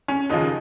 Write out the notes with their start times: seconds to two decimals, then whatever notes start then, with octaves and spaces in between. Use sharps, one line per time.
0.08 C#4
0.29 D#2 C#3 F3 D#4